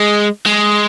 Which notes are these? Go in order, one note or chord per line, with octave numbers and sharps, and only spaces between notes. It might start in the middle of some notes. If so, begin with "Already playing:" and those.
Already playing: G#3
G#3